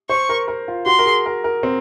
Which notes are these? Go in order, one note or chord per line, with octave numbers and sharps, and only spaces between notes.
C5 C#6
A#4
A#4
F4
F#4 C6
A#4
G#4
A#4
A#4
C4